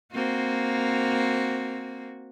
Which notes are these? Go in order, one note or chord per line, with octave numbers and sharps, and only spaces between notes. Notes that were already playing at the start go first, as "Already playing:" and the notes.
A#3 C4 F#4